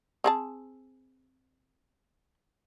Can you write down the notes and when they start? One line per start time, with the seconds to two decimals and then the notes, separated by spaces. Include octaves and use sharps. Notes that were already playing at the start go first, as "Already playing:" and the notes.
0.24 C4 G#4 A5